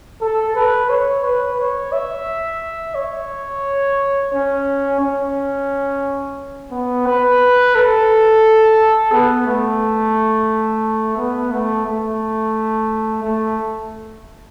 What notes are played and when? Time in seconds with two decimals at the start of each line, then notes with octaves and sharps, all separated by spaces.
0.22 A4
0.56 B4
0.90 C#5
1.24 B4
1.59 C#5
1.92 E5
2.95 C#5
4.33 C#4
5.00 C#4
6.71 B3
7.07 B4
7.75 A4
9.12 B3
9.47 A3
11.17 B3
11.52 A3
11.86 A3
13.23 A3